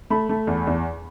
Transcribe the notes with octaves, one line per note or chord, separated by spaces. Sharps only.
A3 B5
A3
E2
E2